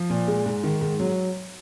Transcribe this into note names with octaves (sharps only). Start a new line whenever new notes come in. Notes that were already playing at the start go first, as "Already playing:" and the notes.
Already playing: F3
A#2
G#3
G#2
D#3
G#2
F#3